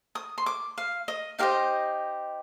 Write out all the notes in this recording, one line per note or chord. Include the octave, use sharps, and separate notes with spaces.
D#6
C6
D6
F5
D#5
D#4 G4 C5 D#5 F5